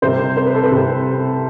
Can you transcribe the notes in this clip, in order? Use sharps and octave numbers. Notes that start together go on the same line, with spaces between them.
C2 C3 G3 C5
C5
B4
A4
B4
C2 C3 G3